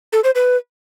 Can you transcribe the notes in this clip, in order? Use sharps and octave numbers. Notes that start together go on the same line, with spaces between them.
A4
C5
B4